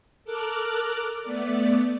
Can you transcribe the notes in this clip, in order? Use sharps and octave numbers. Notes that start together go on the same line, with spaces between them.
A4 A#4 D6 F6 F#6
A3 B3 D5